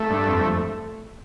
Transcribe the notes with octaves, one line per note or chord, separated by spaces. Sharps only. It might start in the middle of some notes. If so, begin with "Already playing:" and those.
Already playing: A3
G2
F2